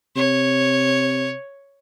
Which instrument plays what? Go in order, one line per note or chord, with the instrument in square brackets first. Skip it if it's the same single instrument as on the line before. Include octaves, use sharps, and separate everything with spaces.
[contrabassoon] C3 [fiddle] C#5